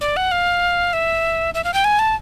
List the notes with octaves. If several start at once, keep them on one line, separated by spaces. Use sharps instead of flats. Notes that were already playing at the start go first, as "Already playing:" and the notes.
D5
F#5
F5
E5
E5
F5
G5
G#5
A5